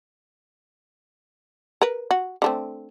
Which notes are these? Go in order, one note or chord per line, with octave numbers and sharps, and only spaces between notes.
A#4 B4
F#4
D3 A3 C4